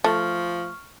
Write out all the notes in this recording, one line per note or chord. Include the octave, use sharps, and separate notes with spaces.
F3 A3 C#6 F6